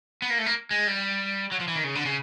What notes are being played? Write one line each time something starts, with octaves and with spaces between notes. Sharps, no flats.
B3
A#3
A3
A#3
G#3
G3
F#3
F3
E3
D#3
C#3
D3
C#3